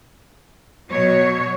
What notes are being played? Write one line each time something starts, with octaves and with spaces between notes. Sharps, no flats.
B2 F#3 C#5